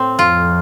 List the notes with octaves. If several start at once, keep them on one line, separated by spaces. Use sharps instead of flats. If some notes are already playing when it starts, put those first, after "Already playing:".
Already playing: A2 C4
F2 F4